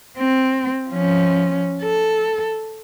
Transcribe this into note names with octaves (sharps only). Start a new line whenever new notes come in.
C4
F3 C#4
A4